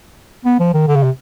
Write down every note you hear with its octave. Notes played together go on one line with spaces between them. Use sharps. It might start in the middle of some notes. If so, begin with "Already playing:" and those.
B3
F3
D#3
D3
C#3
C3